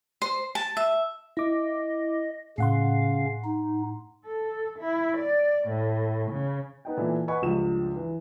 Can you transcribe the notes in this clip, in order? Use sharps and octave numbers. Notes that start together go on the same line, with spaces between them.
C5
A5
E5
E4 D#5 D6
A2 C#3 C#4 F5 F#5 C6
D#4
A4
E4
D5
A2
C#3
B3 D#4 G5
A#2 E3 E4 A4
B4 D#5 F#5 G#5 B5 C#6
C#2 G2 F3 E7
E3